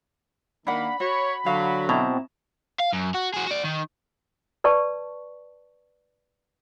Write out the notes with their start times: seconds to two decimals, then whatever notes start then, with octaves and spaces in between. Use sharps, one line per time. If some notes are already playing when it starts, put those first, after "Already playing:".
0.67 D#3 A#3 D4 F#5 B5
1.00 F#4 C#5
1.46 D3 F#3 F5
1.89 B2 C4 E4 A#5
2.80 F5
2.93 F#2
3.15 F#4
3.34 F#4 G#4
3.46 F#4 D5
3.64 D#3
4.64 B4 D5 A5 C#6